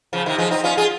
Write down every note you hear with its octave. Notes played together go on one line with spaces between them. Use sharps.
C#3 F3
C3 D#3
F3 G#3
C4 D#4
C#4 F4
F4 G#4